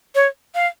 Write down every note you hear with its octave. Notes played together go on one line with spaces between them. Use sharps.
C#5
F5